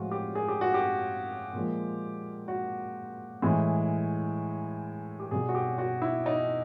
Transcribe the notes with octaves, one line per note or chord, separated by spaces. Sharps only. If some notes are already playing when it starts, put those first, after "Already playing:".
Already playing: A2 F3 G#3 F4 F#4
G4
G#4
G4
F#4
G4
A#2 F3 G#3
F#4
A2 E3 G#3
G4
B2 G3 G#4
F#4
G4
F#4
E4
D#4